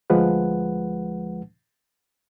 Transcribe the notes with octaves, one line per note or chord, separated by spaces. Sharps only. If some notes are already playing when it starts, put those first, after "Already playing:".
D2 F3 G#3 B4 F#5